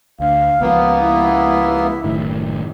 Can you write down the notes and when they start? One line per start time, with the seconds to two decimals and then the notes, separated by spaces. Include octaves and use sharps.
0.20 D2 F5
0.61 C#2 F3 A#3 B3
1.00 E4
2.04 F#1 A2 D#3